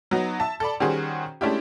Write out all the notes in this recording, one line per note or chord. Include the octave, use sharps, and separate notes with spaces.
F#3 B3 D#4
E5 A5
A4 D5 B5
D#3 G3 C#4 F#4 G#4 C5
G#3 A3 C#4 D4 E4 G4